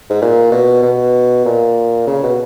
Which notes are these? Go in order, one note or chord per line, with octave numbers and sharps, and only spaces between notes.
G#2
A#2
B2
B2
A#2
C#3
B2